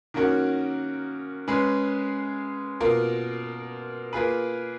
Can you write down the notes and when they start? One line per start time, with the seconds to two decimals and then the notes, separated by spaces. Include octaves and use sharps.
0.14 D#3 A#3 C#4 F#4 A#4
1.48 G#3 C#4 G#4 B4
2.81 B2 A#3 F4 A#4
4.13 A#3 F4 G#4 B4